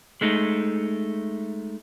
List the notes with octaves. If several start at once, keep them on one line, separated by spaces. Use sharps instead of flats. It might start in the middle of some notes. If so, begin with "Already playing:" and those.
G#3 A3 D#4